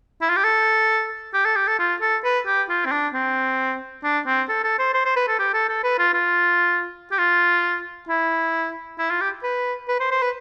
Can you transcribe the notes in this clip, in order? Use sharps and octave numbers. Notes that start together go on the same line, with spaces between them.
E4
F4
G4
A4
G4
A4
G4
A4
F4
A4
B4
G4
F4
C4
D4
C4
D4
C4
A4
A4
C5
C5
C5
B4
A4
G4
A4
A4
B4
F4
F4
G4
F4
E4
E4
F4
G4
B4
B4
C5
C5
B4